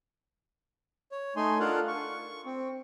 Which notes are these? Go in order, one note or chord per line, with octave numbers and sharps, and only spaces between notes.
C#5
A3 D#4 G#5 C6
D4 F4 A4 A#4 F5 F#5
C#6
C4